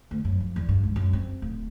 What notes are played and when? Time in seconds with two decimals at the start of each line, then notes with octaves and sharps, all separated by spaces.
0.11 D2
0.25 F#2
0.40 F3
0.56 E2
0.69 G2
0.83 C#2
0.96 F#2
1.13 C4
1.42 D1